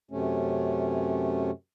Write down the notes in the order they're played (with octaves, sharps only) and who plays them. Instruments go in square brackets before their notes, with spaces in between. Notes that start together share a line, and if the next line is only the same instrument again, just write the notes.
[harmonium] F#2 C3 A3 C#4